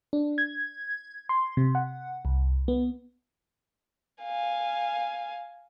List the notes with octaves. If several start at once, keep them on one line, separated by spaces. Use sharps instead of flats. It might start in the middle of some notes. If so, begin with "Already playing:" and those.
D4
G#6
C6
C3
F#5
C2
B3
F5 G#5